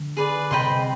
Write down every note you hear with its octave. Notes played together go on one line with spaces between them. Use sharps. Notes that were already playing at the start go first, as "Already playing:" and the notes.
Already playing: D3
G#4 B4 D5
C3 C5 D#5 G5 B5